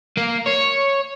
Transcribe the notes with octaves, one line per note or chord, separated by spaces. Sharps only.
A#3
C#5